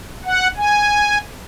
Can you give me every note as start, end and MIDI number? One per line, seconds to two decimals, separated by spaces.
0.24 0.47 78
0.57 1.18 80